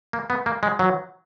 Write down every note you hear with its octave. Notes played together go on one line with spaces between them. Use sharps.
A#3
B3
A#3
G#3
F#3